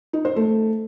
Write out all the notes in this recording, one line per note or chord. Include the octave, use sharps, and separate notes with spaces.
D#4
C5
A3